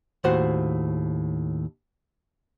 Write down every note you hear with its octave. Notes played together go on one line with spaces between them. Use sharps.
D#2 A2 F#4 C5 F#5